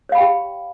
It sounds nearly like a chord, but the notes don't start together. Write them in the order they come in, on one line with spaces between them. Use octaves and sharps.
C#5 F5 B5 G5 G4